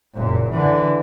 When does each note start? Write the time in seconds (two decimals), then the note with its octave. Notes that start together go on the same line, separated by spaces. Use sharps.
0.14 F#1 A#2
0.50 D3 E3